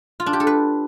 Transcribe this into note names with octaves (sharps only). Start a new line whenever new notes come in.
F4
D4
G4
A4
B4